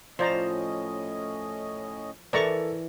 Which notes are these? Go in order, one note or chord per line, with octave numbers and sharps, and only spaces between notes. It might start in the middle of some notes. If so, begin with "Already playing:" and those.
A2 F3 C#4 C5 D5 D#5 A#5
E3 A4 A#4 D5 E5 A#5 C#6